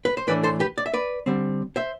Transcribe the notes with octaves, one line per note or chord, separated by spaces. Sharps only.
B4
C5
A2 E3 A3 D4 B4 D5
A4 C5
G4 B4
D5
E5
B4 D5
D3 G3 C4
C5 E5